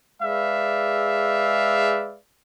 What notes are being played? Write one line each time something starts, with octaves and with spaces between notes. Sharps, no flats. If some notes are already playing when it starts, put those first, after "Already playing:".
G#3 G#4 B4 D5 E5 F5